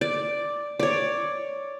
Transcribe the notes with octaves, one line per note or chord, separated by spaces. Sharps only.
D5
C#5 D5